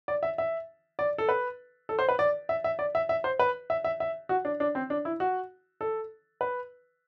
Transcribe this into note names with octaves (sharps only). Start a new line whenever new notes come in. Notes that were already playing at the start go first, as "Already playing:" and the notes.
D5
E5
E5
D5
A4
B4
A4
C5
B4
D5
E5
E5
D5
E5
E5
C5
B4
E5
E5
E5
F#4
D4
D4
C4
D4
E4
F#4
A4
B4